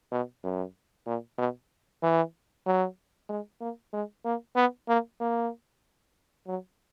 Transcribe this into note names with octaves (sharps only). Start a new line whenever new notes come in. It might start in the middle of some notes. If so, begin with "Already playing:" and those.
B2
F#2
A#2
B2
E3
F#3
G#3
A#3
G#3
A#3
B3
A#3
A#3
F#3